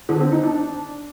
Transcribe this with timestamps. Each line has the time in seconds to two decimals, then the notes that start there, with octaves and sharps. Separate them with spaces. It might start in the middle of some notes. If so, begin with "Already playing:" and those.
0.09 D3
0.20 C4
0.32 D#4
0.43 D4